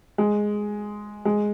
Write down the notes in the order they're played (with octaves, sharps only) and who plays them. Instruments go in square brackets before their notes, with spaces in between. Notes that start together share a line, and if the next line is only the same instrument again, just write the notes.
[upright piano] G#3
G#3